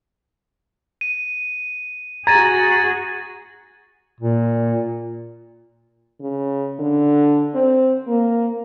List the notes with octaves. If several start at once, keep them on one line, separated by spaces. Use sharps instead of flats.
D#7
F#4 G#4 A#5 G#6 A6 D#7
A#2
C#3
D3
C4
A#3